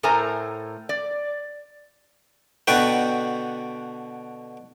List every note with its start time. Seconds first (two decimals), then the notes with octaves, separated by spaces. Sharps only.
0.03 A2 A3 A#4 C5 G#5 A#5
0.89 D5
2.67 B2 D3 F#4 B4 G5